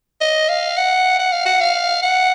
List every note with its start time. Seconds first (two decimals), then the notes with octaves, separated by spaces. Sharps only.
0.21 D#5
0.49 F5
0.78 F#5
1.19 F#5
1.32 F5
1.46 F#5
1.60 F5
2.03 F#5